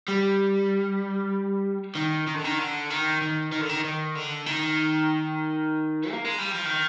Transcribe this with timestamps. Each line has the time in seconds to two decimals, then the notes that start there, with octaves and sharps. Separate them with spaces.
0.08 G3
1.96 D#3
2.28 D#3
2.36 D3
2.45 D#3
2.59 D3
2.90 D#3
3.22 D#3
3.52 D#3
3.61 D3
3.69 D#3
3.85 D#3
4.15 D3
4.47 D#3
6.11 A#3
6.25 G#3
6.38 G3
6.52 F3
6.66 D#3